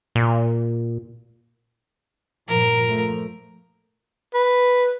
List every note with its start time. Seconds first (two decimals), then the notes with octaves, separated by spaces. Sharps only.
0.15 A#2
2.48 G2 A#2 F3 A#4
2.86 F3 A3
4.34 B4